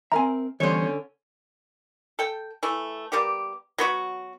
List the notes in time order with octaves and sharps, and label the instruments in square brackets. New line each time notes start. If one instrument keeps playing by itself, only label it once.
[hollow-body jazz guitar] C4 A#4 E5 [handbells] G#5 A#5
[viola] D3 C#4 [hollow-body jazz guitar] E3 G3 B3 [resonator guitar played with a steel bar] C5 C#5
[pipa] A4 G5
E3 A3
G3 A#3 B3 G4
F#3 B3 F#4